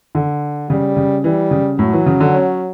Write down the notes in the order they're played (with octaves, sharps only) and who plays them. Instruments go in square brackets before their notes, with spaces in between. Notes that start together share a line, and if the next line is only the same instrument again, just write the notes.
[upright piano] D3
[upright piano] C#3 [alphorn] G3
[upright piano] C#3
[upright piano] E3 [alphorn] G3
[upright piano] C#3
[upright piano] A2 [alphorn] F#3
[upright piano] E3
C#3
D3
C#4